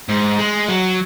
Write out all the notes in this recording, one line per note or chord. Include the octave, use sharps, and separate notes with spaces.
G#2
G#3
F#3